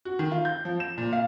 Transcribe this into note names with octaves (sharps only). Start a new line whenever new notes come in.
F#4
D#3
F4
G6
F3
E7
A#2
F5